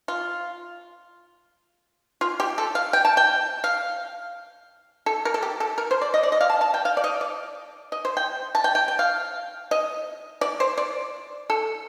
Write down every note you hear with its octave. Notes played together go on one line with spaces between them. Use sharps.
F4
F4
G4
A4
F5
G5
A5
G5
F5
A4
A#4
A4
G4
A4
A#4
C5
D5
D#5
D5
D#5
F5
A5
A5
G5
F5
D5
D#5
D5
D#5
C5
G5
A5
G5
G5
G5
F5
D#5
D5
C5
D5
A4